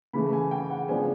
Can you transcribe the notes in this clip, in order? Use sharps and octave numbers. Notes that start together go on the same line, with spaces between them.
C#3 E3 A3 B5
G#5
G5
F#5
C#3 F3 G#3 B3 D4 G#5